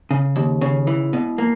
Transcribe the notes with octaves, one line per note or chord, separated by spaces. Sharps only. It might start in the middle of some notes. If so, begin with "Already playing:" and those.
C#3
D#2
C#3
E3
B2
A#3